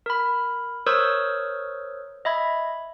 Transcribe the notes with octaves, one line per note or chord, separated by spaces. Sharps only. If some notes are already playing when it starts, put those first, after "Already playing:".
A#4 B5
A#4 C5 C#5 C#6 D#6 E6
D#5 E5 B5 G#6